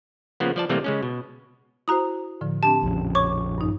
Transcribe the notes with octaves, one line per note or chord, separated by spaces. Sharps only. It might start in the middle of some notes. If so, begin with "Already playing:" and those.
C#3 F3 A#3 B3
F3 D5 A5
C3 E3 G3 A3 A#3 C4
C#3 G#3 C#4
B2
E4 F#4 C5 A#5 D#6
A2 D3 F3
C4 D4 G4 A5
A#1 F2 C#3
C#5 C#6 D6
G2 D#4